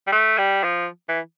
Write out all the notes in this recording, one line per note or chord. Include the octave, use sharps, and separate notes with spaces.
G3
A3
G3
F3
E3